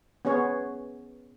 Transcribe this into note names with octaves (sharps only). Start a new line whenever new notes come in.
B3 C#4 G#4 C#5